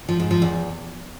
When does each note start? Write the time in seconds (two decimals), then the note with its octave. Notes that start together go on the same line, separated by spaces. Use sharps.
0.08 F3
0.20 G#2
0.31 F3
0.42 E2